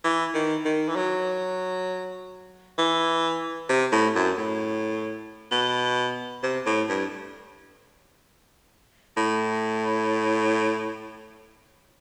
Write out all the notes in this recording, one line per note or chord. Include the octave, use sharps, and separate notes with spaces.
E3
D#3
D#3
E3
F#3
E3
C3
A2
F#2
A2
B2
C3
A2
G2
A2